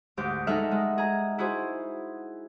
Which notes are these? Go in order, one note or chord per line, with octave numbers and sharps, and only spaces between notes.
D2 G#2 G4 D6 G6
G#3 D#4 A4 E5 F#5 F6
G#3
G#4 A#5
E4 F#4 G#4 C5